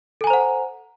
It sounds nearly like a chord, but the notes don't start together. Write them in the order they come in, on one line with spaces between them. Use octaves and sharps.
A4 G#5 A#5 C5 F#5